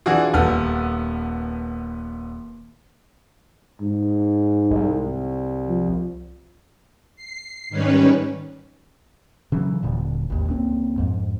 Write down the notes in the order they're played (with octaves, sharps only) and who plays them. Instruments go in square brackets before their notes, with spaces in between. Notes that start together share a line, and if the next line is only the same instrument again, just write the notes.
[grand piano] E3 D4 F4 F#4 G#4
D#1 B3 A4 F6
[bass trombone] G#2
[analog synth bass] C2
[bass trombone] F3
[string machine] C7
G#2 D#3 G3 C#4 B4 C#5
[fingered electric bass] C#3 E3 F#3
D#1 A#2 D3
G#1 D#2
C#2 A#3 C4
F2 G#2